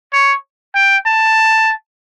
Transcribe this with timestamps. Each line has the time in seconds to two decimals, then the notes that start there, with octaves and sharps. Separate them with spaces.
0.13 C#5
0.75 G5
1.06 A5